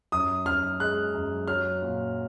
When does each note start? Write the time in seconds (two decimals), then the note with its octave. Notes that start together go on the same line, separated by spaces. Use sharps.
0.12 F#2 D#6
0.45 F#2 F6
0.80 G#3 F#6
1.15 F#2
1.48 F#3 F6
1.82 A#2